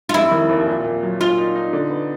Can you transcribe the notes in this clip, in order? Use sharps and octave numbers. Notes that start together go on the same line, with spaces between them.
F4
F1 E4
D#3
D#2
A#2
A#2
F#3
A#2 F4
D#4
D#4
D3
B3